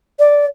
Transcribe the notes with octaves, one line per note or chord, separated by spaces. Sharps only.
D5